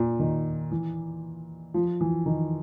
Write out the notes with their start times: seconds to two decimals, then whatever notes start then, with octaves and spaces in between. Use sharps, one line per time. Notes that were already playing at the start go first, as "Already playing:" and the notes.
Already playing: A#2
0.20 D#3
0.71 E3
1.74 F3
2.01 E3
2.26 D#3